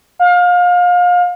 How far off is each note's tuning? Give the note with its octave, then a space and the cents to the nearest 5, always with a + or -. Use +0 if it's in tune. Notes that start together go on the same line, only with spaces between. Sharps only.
F5 +30